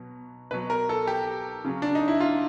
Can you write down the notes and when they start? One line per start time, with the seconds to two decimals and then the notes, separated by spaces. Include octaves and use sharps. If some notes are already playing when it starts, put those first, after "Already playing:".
Already playing: B2 F#3
0.51 B2 F#3 B4
0.70 A#4
0.89 A4
1.07 G4
1.65 C#3 F#3
1.82 D4
1.95 D#4
2.08 E4
2.20 F4